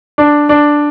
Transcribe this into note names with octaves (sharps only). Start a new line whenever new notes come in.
D4
D4